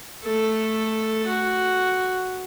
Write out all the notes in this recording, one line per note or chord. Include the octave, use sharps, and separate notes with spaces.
A3 A4
F#4